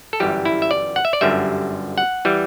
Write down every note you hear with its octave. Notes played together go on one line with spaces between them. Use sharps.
A4
G1 F#2 E3 G3 G4
E4
E5
D5
F#5
E5
D5
G1 F#2 D3 G3 E5
F#5
E3 G3